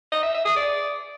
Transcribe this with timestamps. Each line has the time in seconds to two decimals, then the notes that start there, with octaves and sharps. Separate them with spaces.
0.12 D#5
0.23 E5
0.34 E5
0.45 G#4
0.56 D5